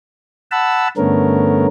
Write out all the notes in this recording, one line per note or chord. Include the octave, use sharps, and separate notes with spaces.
F#5 A5 B5 E6
G2 D3 A3 B3 C#4 A#4